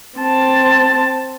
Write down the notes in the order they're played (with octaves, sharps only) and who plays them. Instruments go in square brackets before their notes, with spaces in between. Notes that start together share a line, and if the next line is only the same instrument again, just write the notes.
[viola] C4 A5